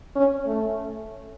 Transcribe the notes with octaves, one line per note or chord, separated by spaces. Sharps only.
C#4
A3